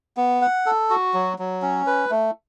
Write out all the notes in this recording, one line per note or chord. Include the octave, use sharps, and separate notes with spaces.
B3
F#5
A4
F#4
F#3
F#3
C#4
B4
A3